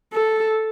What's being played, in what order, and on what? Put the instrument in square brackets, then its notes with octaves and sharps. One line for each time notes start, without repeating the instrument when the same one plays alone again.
[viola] A4